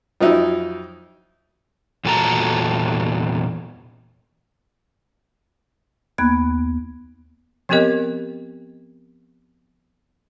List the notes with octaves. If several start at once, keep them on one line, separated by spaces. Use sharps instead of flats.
F2 F3 F#3 D#4 E4
E2 A#2 F#4 A4 A#5
D#2 A#3 B3 B5 F#6 G#6
F3 B3 C4 G4 A#4 D#5